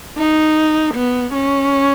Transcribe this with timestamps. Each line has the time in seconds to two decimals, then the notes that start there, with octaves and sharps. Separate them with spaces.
0.18 D#4
0.95 B3
1.34 C#4